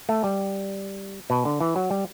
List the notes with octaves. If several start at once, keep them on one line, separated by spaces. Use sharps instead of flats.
A3
G3
B2
D3
E3
F#3
G3